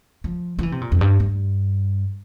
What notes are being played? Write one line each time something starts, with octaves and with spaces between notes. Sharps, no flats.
F3
F3
E3
C3
A#2
F2
G2
G2